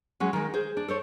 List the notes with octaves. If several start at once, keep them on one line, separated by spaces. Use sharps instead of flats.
F#3 G#3 C#4
D#3 G#3
G#4 C5
D4
A4 C5 C#5